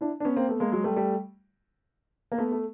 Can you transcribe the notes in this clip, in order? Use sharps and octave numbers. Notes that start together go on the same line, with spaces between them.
D4 E4
D4
B3 C#4
A#3 C4
A3 B3
G#3 A#3
F#3 G#3
G3 A3
G3 A3
A#3
A3 B3
A3